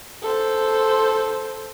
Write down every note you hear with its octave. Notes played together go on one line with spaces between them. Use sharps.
A4 C5